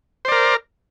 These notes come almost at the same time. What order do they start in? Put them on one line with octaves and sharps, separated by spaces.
C5 D5 A#4